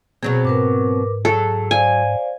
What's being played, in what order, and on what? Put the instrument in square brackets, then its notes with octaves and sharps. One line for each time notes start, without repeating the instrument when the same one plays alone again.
[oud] B2 F#3 C4 [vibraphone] G#4
[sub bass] G#2 [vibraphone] A#4 B4 D6
[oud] F#3 [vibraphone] G#4 [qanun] A4
[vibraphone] C5 D5 F5 [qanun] G#5